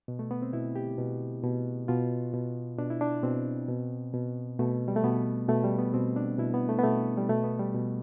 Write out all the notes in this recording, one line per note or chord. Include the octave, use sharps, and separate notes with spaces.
B2
A3
B3
C4
B2 E4
G4
B2
B2
B2 F4
B2
B2 D4
E4
D4
B2 C4
B2
B2
B2 A3
G3
A3
B2 B3
B2 A3
G3
B3
B2 C4
D4
B2 E4
B3
A3
B3
B2 A3
G3
B2 A3
B3
G3
B2